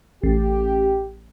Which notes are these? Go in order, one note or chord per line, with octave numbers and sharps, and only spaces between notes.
A1 G4